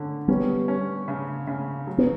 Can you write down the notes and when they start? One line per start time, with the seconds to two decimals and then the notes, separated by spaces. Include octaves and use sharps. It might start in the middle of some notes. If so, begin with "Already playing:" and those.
Already playing: D3 C#4
0.28 G3 B3 C#4
0.68 C#4
1.08 C#3
1.47 C#3
1.87 F#3
1.98 B3